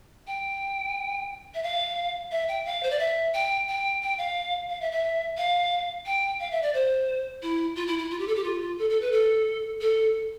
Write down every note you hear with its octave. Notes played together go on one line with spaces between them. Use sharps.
G5
E5
F5
E5
G5
F5
C5
D5
E5
G5
G5
G5
F5
F5
E5
E5
F5
G5
F5
E5
D5
C5
E4
F4
E4
E4
F4
G4
A4
G4
F4
F4
A4
A4
B4
A4
A4